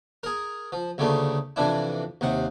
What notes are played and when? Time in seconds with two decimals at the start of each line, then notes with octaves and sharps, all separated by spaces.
0.23 G#4 A#4
0.72 F3
0.98 D2 C#3 G3 A3 A#3
1.56 F2 C3 E3 D4 E4
2.21 D#2 C3 F#5